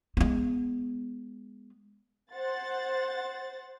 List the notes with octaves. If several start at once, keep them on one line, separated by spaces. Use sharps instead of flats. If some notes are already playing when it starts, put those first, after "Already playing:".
G#3 B3
C5 F#5 A6